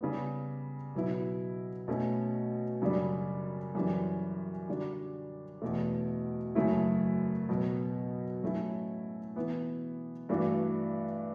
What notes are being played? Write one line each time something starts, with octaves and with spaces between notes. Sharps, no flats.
C#3 G3 B3
B2 F#3 B3 E4
B2 A3 C#4
F#2 C#3 G3 D4
F#2 E3 G3 C#4
D3 G3 D4 F#4
E2 B2 A3
F#2 C#3 F#3 A3 E4
B2 F#3 B3
A2 F#3 A3 C#4 E4
E3 B3 E4
G2 E3 A3 D4 F#4